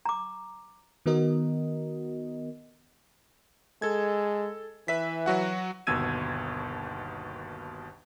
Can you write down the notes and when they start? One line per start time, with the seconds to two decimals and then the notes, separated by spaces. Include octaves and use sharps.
0.06 A#5 D6
1.06 D#3 B3 F#4 A#4 D#5
3.82 G#3 A4 G#6
4.88 E3 B4 E5 B6
5.26 F#3 F#4 F#5
5.87 G1 D#2 B2 E6 G#6 D#7